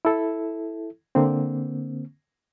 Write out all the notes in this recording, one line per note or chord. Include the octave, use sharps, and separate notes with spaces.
E4 A4
D3 A#3 C4